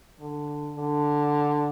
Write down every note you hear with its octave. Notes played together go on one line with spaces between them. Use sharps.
D3
D3